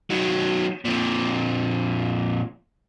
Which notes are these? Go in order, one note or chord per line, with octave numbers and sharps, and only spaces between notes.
D#3 F#3
F2 A#2